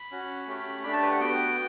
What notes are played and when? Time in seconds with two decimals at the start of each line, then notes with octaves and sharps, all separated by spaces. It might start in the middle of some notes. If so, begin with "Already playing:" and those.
Already playing: B5
0.11 C#4 F#4
0.47 A3 C#4 G4
0.83 A3 D4 G4 B5
0.93 A5
1.02 B4
1.11 F#5
1.20 B3 F#4 G5